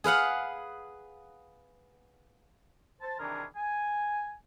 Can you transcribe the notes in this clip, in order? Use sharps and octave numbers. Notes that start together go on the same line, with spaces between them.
G#4 B4 F5 F#5
C5 A5
C3 D#3 E3 D4 G#4 A#4
G#5